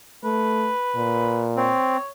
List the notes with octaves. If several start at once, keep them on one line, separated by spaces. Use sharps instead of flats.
A3 B4
A#2
C4 C#5